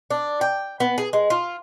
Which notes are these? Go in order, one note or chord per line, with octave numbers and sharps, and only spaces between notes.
D4
G5
B3
G#4
G#3
F4